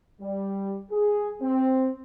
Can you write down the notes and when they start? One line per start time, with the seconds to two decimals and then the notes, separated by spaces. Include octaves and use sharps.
0.21 G3
0.92 G#4
1.42 C4